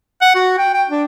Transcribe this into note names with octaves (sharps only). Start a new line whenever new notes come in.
F#5
F#4
G5
G5
D4